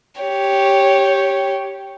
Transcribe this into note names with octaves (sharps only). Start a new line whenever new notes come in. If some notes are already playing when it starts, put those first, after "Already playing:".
G4 C#5